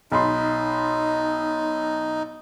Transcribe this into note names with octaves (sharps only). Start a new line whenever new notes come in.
B1 D#4 B5 C6